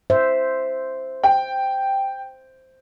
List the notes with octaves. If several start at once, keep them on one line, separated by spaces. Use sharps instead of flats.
C5 E5
G5